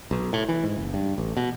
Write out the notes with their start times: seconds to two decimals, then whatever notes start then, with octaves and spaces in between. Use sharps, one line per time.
0.11 B1
0.33 A2
0.48 E3
0.64 G#2
0.77 F#1
0.94 G2
1.18 A1
1.37 B2